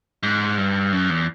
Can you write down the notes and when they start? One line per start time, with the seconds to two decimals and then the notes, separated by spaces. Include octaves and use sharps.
0.23 G#2
0.58 G2
0.92 F#2
1.09 E2